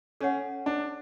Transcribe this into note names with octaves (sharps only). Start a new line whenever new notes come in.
C#4 A4 C#5 F#5
D4